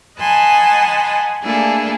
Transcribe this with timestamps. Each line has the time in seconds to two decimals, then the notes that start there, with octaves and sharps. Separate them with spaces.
0.18 D#5 F#5 G#5 A5 B5 C6
1.41 A3 A#3 D4 E4 G#4 A4